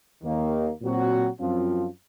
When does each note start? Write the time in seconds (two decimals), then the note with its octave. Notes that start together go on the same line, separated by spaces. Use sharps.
0.23 D#2 D#3 A#3
0.82 A#2 F#3 C4 F#4
1.39 F#2 F3 C4 F4